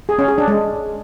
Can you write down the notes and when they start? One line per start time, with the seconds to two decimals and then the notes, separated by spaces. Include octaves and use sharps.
0.09 G#4
0.19 C#4
0.28 G#4
0.38 D4
0.48 G#3